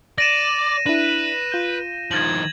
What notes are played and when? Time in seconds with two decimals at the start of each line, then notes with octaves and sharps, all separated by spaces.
0.18 D5 A#6 D#7 E7
0.86 D4 E4 B4
1.52 F4 G6
2.11 D#3 F3 G#6 A6 F#7